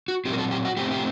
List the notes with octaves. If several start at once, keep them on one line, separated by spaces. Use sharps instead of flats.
F#4
A#2 F#3 C4 G4
A#4
A4
G4
F#4
A2 A3 C4 G4
G4